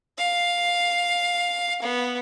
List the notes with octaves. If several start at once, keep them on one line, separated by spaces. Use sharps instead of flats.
F5
B3